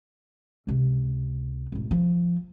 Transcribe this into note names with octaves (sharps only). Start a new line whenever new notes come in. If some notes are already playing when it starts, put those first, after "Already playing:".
C#2 C3
E1 A1
F3